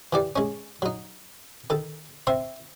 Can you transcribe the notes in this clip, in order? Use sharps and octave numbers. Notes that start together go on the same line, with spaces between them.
E3 G4 D5
G#3 C#4
F#3 D#4
D#3 A4
C4 E5 C6